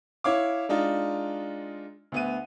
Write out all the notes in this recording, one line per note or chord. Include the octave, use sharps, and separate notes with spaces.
E4 C#5 F5 D6
G#3 D4 D#4 F4
D2 B3 D#7